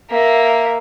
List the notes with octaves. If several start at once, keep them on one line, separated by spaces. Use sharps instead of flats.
A#3 E5